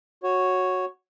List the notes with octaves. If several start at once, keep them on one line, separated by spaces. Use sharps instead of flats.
F#4 C#5